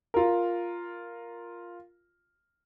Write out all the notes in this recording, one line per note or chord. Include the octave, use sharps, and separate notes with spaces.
F4 A#4